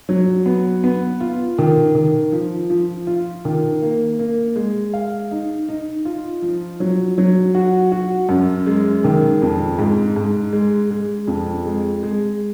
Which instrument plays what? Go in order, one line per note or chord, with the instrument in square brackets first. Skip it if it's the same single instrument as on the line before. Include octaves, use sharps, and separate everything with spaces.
[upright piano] F#3
B3
B3
F4
D#3
D#3
F3
F3
F4
D#3
A#3
A#3
G#3
F5
D#4
D#4
F4
F3
F#3
F#3
F#4
F#4
F#2
G#3
D#3
F2
G#2
G#2
G#3
G#3
F2
G#3
G#3